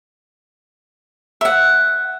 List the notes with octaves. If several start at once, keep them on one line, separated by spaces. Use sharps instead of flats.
E5 F#5